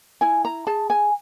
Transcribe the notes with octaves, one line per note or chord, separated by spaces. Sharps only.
E4 G#5
A#5
G#4 A5
G#5